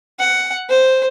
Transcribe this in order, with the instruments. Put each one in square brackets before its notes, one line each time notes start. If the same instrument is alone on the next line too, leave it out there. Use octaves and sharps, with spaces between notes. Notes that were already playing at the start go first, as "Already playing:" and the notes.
[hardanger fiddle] F#5
C5